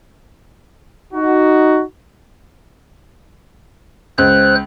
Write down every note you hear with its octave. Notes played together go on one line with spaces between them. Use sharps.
D#4 F#4
C#2 C5 F#6